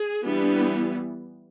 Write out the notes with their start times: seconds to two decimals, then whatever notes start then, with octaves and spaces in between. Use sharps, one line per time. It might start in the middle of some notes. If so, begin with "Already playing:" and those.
Already playing: G#4
0.25 E3 G3 B3 D4
0.42 D4
0.58 E4